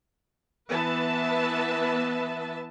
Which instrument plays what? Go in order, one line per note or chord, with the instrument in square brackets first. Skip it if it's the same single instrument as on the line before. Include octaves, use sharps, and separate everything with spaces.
[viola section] E3 B3 B4 E5 A5